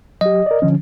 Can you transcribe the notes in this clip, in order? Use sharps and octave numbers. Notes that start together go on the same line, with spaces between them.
F#3 G4 D#5
A#4 D5
D3 F3 C#4